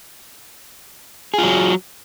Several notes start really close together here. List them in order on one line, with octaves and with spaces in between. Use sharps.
G#4 F4 F#3